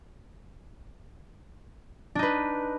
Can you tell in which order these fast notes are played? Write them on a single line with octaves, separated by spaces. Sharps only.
D4 D#4 B4